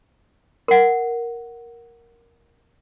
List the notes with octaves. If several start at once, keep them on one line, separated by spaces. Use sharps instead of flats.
A#4 F#5